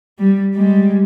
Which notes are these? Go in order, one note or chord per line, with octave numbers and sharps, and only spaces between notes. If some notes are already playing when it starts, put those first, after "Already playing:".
G3
G3 G#3